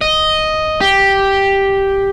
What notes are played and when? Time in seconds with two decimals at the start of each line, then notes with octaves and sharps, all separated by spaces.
0.01 D#5
0.81 G4